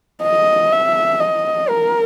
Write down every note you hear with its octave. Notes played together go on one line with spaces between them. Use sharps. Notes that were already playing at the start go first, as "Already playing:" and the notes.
D#5
E5
D#5
A#4